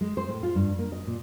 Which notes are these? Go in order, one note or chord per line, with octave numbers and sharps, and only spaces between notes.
G#3
C5
A2
F4
G2
A#3
D#5
A#2